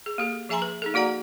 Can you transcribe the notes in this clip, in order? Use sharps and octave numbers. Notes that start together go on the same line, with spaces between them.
G#4
A#3 G4 A4
F3 G#4 E5 G#5 A#5 C6
B4
D#4 G#4 A4
A#3 F#4 D5 F#5 A#5